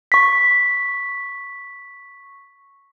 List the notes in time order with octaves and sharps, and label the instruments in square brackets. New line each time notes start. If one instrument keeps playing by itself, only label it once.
[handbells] C#6 B6